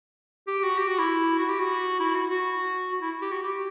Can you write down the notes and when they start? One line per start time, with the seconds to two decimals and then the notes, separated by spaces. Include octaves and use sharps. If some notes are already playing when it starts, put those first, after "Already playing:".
0.47 G4
0.64 F#4
0.78 G4
0.88 F#4
0.99 E4
1.39 F#4
1.49 G4
1.59 F#4
2.00 E4
2.15 F#4
2.30 F#4
2.92 F#4
3.01 E4
3.22 G4
3.32 F#4
3.42 G4